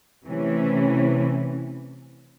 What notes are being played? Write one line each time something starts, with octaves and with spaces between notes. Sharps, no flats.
C3 E3 A3 C#4